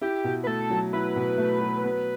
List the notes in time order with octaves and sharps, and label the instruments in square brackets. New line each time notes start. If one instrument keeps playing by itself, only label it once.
[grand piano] E4 [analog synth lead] G4
[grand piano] B2
[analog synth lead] B4
[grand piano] A3 [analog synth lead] A4
[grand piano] F#3
[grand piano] E4 [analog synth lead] B4
[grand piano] B2
A3
F#3
B3